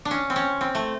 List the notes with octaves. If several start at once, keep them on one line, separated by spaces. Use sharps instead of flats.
D4
C#4
C4
C#4
C4
A3